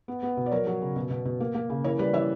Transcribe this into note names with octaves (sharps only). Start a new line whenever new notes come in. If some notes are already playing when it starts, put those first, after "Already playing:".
B3
B3
B2
D5
F#3 A#4 C#5
F#3
C#3
B2
B2
B2
A#3
A#3
C#3
E3 A#4 C#5
G3 B4 D5
E3 C#5 E5